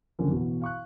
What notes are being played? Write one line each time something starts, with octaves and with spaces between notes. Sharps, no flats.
F#1 F2 D3 A#3 C#4
A1 B2
F5 C#6 F#6